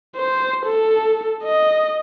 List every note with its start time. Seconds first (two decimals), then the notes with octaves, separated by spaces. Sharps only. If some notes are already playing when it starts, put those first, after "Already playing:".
0.16 C5
0.66 A4
1.43 D#5